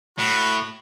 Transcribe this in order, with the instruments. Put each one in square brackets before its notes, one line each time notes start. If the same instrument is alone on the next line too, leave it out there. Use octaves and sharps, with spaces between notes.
[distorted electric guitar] A2 [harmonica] F#4 B5